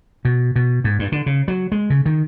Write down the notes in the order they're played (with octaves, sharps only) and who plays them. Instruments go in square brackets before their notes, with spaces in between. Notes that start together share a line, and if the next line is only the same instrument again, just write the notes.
[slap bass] B2
B2
G#2
G2
D3
C#3
F#3
G#3
C#3
D#3